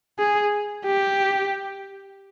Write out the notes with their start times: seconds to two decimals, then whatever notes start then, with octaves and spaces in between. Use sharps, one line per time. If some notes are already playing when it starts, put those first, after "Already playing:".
0.19 G#4
0.86 G4